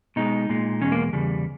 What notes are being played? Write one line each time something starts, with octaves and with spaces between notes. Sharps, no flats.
B2 G#3 D#4
A#2 G#3
E2 B2 G#3 C#4
A#3
E2 C#3 G3